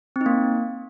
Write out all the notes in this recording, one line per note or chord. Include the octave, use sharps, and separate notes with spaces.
C4
D#4
A#3